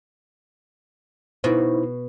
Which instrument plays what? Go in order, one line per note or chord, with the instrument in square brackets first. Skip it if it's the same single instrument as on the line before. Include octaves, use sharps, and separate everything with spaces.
[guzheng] B2 F#4 [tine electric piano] D#4 E4 C5